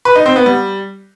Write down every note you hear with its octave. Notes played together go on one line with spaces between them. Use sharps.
B4
D#4
C4
B3
G3